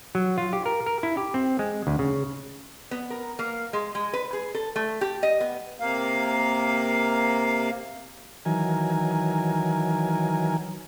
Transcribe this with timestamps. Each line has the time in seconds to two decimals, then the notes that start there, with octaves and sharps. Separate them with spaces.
0.15 F#3
0.38 F4
0.53 G4
0.66 A#4
0.86 A#4
1.03 E4
1.17 G4
1.34 C4
1.59 G#3
1.87 D2
1.99 C#3
2.91 B3
3.10 A#4
3.39 A#3
3.73 G#3
3.95 G#3
4.13 B4
4.33 G#4
4.54 A4
4.76 A3
5.01 G4
5.23 D#5
5.40 B3
5.80 C3 A#3 F5
8.45 D#3 E3 F#3 A#4 G#5